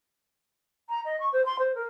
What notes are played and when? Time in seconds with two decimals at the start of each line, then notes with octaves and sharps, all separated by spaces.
0.89 A#5
1.05 D#5
1.20 C#6
1.33 C5
1.46 C6
1.59 C5
1.75 A#4